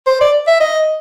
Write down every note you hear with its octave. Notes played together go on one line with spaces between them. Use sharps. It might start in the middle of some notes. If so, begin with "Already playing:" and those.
C5
D5
E5
D#5